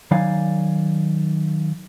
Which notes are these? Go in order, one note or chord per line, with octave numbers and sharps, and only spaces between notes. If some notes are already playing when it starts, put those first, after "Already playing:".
D#3 F#3 D#4 D5 F5 G#5